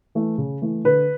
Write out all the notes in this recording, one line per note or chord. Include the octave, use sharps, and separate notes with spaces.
E3 A3
C#3
E3 A3
D3 B4